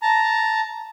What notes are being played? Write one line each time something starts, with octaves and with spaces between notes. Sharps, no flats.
A5 A#5